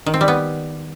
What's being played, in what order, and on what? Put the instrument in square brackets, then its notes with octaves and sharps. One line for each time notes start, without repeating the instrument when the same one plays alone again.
[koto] D#3
C4
G3
B3